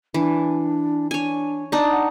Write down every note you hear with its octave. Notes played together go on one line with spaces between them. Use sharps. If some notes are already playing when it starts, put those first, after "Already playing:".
E3 D4
D4 C#5 G#5
D4 D#4
F#5